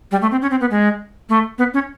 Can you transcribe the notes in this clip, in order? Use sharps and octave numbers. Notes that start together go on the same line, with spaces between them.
G3
A3
C4
C#4
C4
B3
G#3
A3
B3
C#4